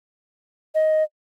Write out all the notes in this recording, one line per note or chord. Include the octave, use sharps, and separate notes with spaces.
D#5